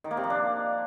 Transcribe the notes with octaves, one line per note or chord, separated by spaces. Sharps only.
D#3
A#3
C3
F3
D4